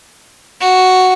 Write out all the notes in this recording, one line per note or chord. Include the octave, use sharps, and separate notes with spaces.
F#4